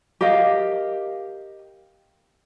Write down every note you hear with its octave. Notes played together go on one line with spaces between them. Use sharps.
G4 A#4 D#5 F5